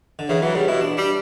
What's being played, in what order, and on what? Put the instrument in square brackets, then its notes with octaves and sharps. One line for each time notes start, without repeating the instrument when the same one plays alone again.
[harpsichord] D3
[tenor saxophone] C#3 [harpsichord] E3
[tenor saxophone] E3 [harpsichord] F#3
[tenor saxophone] C#3 [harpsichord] G3
[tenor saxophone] B2 [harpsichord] E4
[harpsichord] D4
[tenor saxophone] G3 [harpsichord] D4